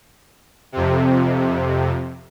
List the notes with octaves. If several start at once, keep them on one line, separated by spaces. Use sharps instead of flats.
F2 C3